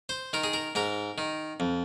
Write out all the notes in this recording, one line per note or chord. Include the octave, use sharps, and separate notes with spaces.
C5
D#3 A#4
G#4
A#4
G#2 A#4
D#3
F2